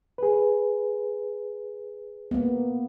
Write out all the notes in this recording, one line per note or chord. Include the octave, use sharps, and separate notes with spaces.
G#4 B4
A#3 B3